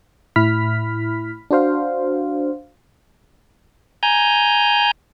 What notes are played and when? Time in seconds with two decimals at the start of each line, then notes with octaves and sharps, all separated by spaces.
0.36 A2 E4 B5 F6 B6
1.51 D4 F#4 C5 F5
4.03 G#5 A#5 G6